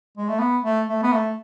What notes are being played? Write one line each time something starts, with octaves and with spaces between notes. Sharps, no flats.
G#3
A3
B3
A3
A3
B3
A3